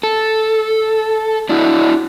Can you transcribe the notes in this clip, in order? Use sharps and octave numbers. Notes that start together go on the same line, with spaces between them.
A4
D4 E4 F#4